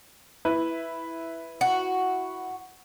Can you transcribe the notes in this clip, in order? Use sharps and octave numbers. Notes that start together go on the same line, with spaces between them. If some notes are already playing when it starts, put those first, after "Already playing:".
E4 B4
F#4